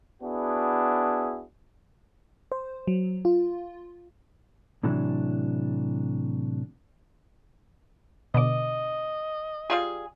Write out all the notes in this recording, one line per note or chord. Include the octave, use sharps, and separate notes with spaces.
B3 D4 E4 F#4 G#4
C5
F#3
F4
A2 C3 E3 F#3 D4
B2 D3 D#5 D6
G3 F4 G#4